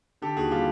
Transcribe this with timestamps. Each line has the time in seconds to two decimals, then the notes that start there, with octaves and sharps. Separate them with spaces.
0.22 D3 G4 A4
0.36 D#2 F#4 G#4
0.51 G3 F4 G4